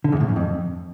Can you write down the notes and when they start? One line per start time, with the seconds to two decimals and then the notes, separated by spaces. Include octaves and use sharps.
0.04 D3
0.12 E2
0.20 A2
0.28 F#2
0.36 F2